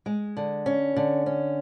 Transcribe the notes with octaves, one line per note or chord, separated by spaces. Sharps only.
G#3
D3
C#4
D3
C#4